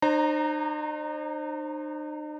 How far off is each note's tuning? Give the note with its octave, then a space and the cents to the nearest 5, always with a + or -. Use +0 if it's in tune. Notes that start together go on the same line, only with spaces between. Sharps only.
D#4 -45 C5 +25 A#5 -5